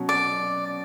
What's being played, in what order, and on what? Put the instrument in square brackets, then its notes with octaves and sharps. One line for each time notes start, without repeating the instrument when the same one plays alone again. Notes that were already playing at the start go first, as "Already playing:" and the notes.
Already playing: [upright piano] B2 F#3 C#4
[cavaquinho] D5